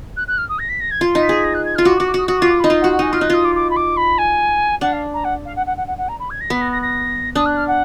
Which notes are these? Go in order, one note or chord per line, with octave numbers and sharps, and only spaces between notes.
F#6
F#6
F6
D#6
A#6
B6
A#6
G#6
F4
D#4
B6
G#4
A#6
F#6
G#6
F4 F6
F#4 D6
D6
F#4
D6
F#4 D#6
F#4 D#6
D6
F4
D6
D#4 B5
F4
F#5
F#4
F#5
D#4 G#5
F4 F6
D#4 F#6
F4 D#6
D6
D6
B5
D6
B5
G#5
D4 F#5
F5
A#5
F#5
F5
F#5
F#5
F#5
F#5
F#5
A#5
B5
G#6
A#6
B3 B6
A#6
A#6
A#6
D4 D#6
F#6
F6
F#5